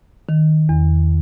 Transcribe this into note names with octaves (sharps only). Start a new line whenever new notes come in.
D#3
E2